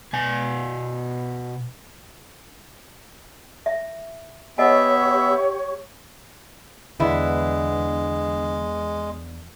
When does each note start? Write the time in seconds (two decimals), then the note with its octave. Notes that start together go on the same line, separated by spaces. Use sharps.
0.13 B2 G#5
3.66 E5
4.58 B3 G4 C#5 D#5 E5 F#5 G#5 C#6
7.00 E2 D3 G#3 B3 D4 E4